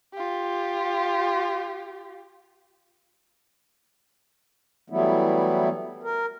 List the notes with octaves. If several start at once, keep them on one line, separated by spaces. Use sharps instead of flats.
F4 G4
E3 F#3 G3 A3 B3 E4
A#4